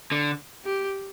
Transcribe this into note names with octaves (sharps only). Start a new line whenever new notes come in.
D3
G4